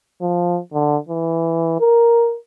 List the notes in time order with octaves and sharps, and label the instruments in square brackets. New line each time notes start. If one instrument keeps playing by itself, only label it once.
[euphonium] F3
D3
E3
A#4